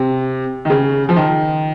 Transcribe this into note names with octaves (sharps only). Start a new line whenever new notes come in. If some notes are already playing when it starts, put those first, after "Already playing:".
Already playing: C3
D#3
C#3
F3
D#3